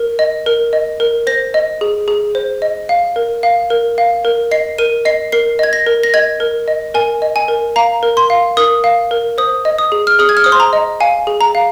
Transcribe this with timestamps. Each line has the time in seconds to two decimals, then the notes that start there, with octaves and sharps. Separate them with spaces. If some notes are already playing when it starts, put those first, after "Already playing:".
Already playing: A#4
0.19 D#5
0.46 A#4
0.73 D#5
1.00 A#4
1.27 C5 A#6
1.54 D#5
1.81 G#4
2.08 G#4
2.35 C5
2.62 D#5
2.89 F5
3.16 A#4
3.43 F5
3.70 A#4
3.98 F5
4.25 A#4
4.51 D#5 C7
4.78 A#4 D#7
5.05 D#5 C7
5.32 A#4 C7
5.59 D#5 G#6
5.73 A#6
5.86 A#4
6.03 A#6
6.14 D#5 G#6
6.40 A#4
6.68 D#5
6.94 A#4 G#5
7.22 D#5
7.36 G#5
7.48 A#4
7.76 F5 A#5
8.03 A#4
8.17 C6
8.30 F5
8.57 A#4 D#6
8.84 F5
9.11 A#4
9.38 C5 D#6
9.65 D#5
9.78 D#6
9.92 G#4
10.07 F6
10.19 G#4 D#6
10.29 G#6
10.37 F6
10.44 C5 D#6
10.52 C6
10.60 A#5
10.73 D#5
11.00 F5 G#5
11.27 G#4
11.41 A#5
11.55 F5